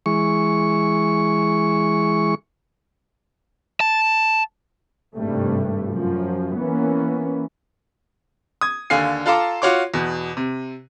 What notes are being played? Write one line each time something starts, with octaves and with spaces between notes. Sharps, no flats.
E3 G#3 C#6
A5
G#1 G2 C3 G3 A3
F#2 F3
E3 A#3 B3 C#4
D#6 G#6
D#2 D3 F5 G#5 C7
F4 A4 F5 A5 A#5 D6
F4 F#4 C#5 C6 D6
E2 B2
C3